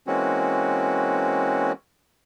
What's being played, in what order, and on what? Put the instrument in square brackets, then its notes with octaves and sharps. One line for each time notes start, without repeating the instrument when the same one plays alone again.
[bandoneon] E3 G#3 A#3 C4 C#4 F#4